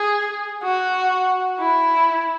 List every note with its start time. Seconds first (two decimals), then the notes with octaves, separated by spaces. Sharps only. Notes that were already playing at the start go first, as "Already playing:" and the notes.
Already playing: G#4
0.63 F#4
1.59 E4